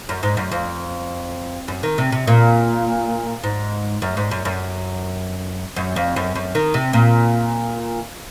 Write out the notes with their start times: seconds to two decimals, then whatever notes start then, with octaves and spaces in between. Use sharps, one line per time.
0.09 F#2
0.23 G#2
0.37 F#2
0.52 F2
1.68 F#2
1.83 D#3
1.98 C3
2.12 C3
2.27 A#2
3.44 G#2
4.02 F#2
4.17 G#2
4.31 F#2
4.45 F#2
5.76 F#2
5.96 F2
6.16 F#2
6.35 F#2
6.55 D#3
6.74 C3
6.93 A#2